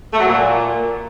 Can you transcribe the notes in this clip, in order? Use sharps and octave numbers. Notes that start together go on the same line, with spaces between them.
A3
F#3
A#2